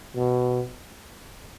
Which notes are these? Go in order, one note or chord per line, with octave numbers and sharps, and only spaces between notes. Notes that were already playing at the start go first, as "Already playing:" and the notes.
B2